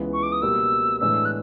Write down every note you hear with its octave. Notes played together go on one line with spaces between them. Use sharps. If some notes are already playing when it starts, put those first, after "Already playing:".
Already playing: C#2 C#3 E3 G#3 B3
C#6
D6
D#6
B2 G3 A#3 E6
A2 E3 G#3 B3 D4 E6
F#6